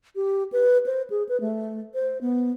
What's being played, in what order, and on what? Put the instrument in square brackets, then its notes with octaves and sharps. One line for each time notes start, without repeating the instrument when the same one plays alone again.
[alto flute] G4
B4
C5
G#4
B4
A3
C5
B3